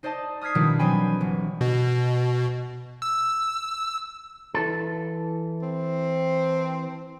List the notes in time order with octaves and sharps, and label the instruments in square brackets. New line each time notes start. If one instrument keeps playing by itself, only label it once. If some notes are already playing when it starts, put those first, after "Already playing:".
[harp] D#4 C5 D5 D#5 A5
D#6 F6 G#6 B6 C7
B2 D#3 F3 G3 D4 E4
E3 F#3 C4 G5 G#5 B5
G1
[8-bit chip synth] B2
E6
[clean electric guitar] E3 A4
[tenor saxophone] C4